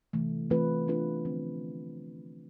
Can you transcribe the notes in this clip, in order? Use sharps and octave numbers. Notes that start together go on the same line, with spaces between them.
C3 E3 A3
E3 A3 C4 F4 B4
B3 D4 F4 B4
D3 F3 C4